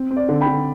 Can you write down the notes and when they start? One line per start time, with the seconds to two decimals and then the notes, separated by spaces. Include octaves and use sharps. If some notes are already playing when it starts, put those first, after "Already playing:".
Already playing: C4
0.11 C4
0.17 D5
0.29 D3
0.41 G5 B5
0.46 D3